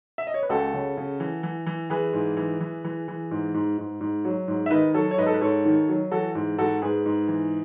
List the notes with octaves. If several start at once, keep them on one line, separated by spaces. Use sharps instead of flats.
E5
D#5
C#5
B4
C#2 F#4 A4
C#3
C#3
E3
E3
E3
E3 G#4 B4
G#2
E3
E3
E3
E3
G#2
G#2
G#2
G#2
F#3
G#2
E5
D#3 B4 D#5
F#3 A4 C#5
C#5
G#2 B4 D#5
A4
B4
G#2 A4 C#5
D#3
F#3
E3 F#4 A4
G#2
G#2 F#4 A4
G#2 G#4 B4
G#2
E3